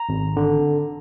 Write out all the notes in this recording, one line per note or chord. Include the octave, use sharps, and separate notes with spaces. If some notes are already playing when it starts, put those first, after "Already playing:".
Already playing: A#5
G#1
D3